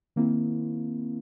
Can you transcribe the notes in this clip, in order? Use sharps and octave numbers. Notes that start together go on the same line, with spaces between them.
D#3 A#3 C4 E4